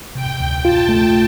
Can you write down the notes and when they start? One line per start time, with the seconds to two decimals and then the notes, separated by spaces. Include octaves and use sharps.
0.15 C3 G5
0.40 D2
0.64 F4 A5
0.89 A3